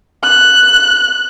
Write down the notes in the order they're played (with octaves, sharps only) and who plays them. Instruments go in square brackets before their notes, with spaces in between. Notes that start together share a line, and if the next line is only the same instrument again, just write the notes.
[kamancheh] F#6